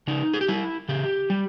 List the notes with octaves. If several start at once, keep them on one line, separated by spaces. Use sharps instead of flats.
C#3 D#4
G#4
G4
G3 E4
C#3 G4
G3